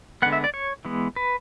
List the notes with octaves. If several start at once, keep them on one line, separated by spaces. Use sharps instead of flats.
D3 G#3 B3 F#5
E5
D5
C#5
E3 G#3 B3
B4